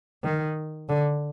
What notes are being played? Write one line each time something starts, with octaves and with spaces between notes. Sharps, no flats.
D#3
D3